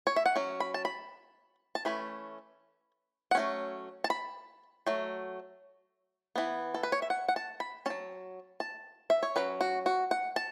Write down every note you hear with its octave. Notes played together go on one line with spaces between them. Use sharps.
C#5
E5
F#5
F#3 C#4
B5
A5
B5
A5
E3 A3 C#4 B5
F#5
F#3 A3 C#4
A5
B5
F#3 A3
E3 B3
A4
B4
C#5
E5
F#5
F#5
A5
B5
F#3 C#4 A5
A5
E5
C#5
F#3 C#4 B4
F#4
F#4
F#5
A5